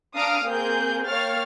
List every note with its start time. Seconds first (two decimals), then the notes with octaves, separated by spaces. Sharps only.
0.16 D4 F5 A#5 D#6 F6 D7
0.46 A#3 C4 G#4 A#4 G6
1.08 A#3 C#5 F5 G5 F6 A6